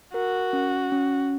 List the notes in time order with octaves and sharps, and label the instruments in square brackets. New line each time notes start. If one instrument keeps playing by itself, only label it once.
[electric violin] F#4 [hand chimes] A#4
[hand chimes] C#4
C#4